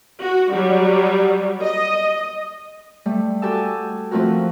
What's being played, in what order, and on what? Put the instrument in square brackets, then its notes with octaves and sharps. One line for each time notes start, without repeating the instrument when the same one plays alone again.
[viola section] F#4
F#3 G3
D#5
[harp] G3 A3
F#4 G4 A4 G#5 A5 E6
F3 A3 C4 F4 F#4 A#4